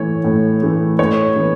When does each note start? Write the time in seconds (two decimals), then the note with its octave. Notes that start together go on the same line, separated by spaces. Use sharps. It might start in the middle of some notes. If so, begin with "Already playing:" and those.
Already playing: A2 E3 A3 C#5
0.24 A2
0.62 E3 A3
0.99 A2 C#5
1.36 E3 B3